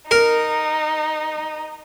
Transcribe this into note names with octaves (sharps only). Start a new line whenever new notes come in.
D#4 A#4